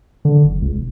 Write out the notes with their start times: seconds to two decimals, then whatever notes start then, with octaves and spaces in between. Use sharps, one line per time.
0.25 D3
0.44 F#1
0.62 C#2
0.75 E1